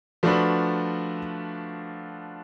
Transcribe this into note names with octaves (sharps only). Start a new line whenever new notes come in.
F3 A3 D4 F#4 B4